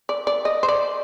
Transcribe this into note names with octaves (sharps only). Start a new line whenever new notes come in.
D5
D5
D#5
C5
D5